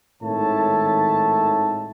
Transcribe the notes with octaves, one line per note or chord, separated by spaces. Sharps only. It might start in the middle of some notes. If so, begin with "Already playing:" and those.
G#1 A2 D#3 C#5 E5 A5